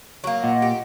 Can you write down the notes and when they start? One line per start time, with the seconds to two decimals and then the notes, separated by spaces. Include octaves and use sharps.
0.24 F#3 A#3
0.44 A#2 D#5 F#5
0.62 G4